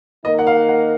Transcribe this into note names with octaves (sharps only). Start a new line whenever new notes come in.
D#3 A#3 D#4 A#4 D#5
F#5
F5
F#5